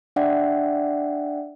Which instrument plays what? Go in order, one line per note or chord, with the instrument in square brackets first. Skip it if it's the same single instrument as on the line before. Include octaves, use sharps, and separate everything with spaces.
[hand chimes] D4 D5 E5 F#5 G5